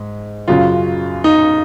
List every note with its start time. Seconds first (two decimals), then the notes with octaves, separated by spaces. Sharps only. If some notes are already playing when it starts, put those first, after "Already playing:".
Already playing: G#2
0.48 F#2 C#3 F#3 F4
1.24 D#4